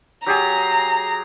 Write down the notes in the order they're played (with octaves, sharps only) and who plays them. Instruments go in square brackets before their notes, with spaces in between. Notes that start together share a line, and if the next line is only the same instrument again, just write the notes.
[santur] F#3 G4 G#4 [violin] A#5